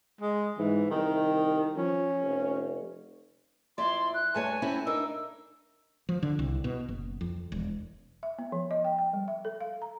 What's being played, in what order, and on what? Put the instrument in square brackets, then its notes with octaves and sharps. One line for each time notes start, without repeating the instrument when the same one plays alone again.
[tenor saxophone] G#3
[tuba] G#2 [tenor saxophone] E3
[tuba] C2 [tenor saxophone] D#3
[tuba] F3 [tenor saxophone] C#4
[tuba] F1
[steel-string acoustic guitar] F2 E4 D5 [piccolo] C6
[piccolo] F#6
[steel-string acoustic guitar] G2 A3 C#5 [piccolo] G#5
[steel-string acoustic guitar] C4 C#4 E4
[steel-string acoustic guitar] D4 D#4 A#4 [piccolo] E6
[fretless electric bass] F3
D3
C2
B2
F#1
F2
E1
[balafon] E5
B3
F3
D#5
G5
G5
G3
E5
A4
F5
A#5